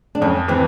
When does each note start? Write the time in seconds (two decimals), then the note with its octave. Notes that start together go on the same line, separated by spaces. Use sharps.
0.15 D4
0.21 F2 C#4
0.48 E3 C4